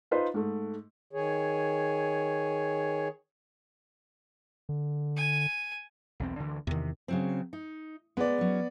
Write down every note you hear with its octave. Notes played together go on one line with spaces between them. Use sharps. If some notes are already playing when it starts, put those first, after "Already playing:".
D#4 F4 B4 C5
G#2 A3
D#3 G#4 C#5
D3
G#5
B1 E2 C4
D2 D3 E3
E2 C3 D#3
C#3 F#3 C4
D#4
G#3 B3 D5
F#3 C#4